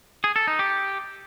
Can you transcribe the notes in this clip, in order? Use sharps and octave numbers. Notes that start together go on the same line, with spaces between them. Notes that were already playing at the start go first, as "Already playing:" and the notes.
G#4
A4
D#4
G4